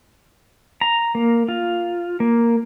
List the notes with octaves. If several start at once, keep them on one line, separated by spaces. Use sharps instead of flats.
A#5
A#3
F4
A#3